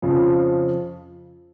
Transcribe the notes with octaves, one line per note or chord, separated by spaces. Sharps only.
F2 C#3 F3